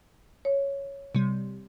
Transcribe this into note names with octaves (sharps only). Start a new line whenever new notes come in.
C#5
C3 G3